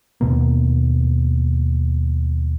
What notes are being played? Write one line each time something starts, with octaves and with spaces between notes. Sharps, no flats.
D#2 B2 A#3